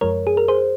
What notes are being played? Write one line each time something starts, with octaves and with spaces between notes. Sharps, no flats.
F#2 F3 G#3 A#4 C#5
G#4
A#4
G#4 C5